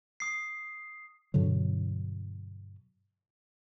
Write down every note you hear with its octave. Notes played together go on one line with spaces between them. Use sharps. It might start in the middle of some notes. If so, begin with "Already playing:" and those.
D#6 C7
G2 B2 D3 F#3